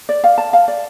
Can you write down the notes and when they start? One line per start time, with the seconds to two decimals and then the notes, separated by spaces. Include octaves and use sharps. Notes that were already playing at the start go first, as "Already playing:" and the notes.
0.09 D5
0.24 F5
0.38 A5
0.53 F5
0.68 D5